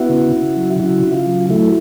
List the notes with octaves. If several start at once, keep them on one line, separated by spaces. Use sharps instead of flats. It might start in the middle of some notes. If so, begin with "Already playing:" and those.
Already playing: B3 E4 F#4
C#3
C#3
F#3
C#3 E4 F#4
C#3
F4
F#3
A3 E4